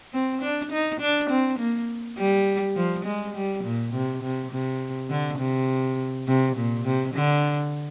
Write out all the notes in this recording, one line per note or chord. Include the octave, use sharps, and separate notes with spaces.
C4
D4
D#4
D4
C4
A#3
G3
F3
G#3
G3
A#2
C3
C3
C3
D3
C3
C3
A#2
C3
D3